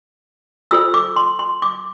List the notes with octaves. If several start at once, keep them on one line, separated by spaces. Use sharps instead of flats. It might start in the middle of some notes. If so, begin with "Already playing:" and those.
F4 A4 C5 E6
D6
C6
C6
D6